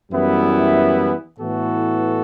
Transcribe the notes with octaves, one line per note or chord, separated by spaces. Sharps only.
F#2 E3 G3 B3 E4
A2 E3 B3 F#4 A4